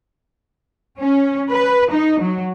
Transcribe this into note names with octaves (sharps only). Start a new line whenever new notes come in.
C#4
B4
D#4
F#3